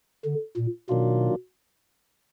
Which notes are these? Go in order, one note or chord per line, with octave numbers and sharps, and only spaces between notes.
D3
A#2
B2 D#3 F#3 A#3 D4 F4